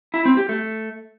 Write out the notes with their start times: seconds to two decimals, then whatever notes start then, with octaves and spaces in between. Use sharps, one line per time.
0.14 E4
0.25 C4
0.37 G4
0.49 A3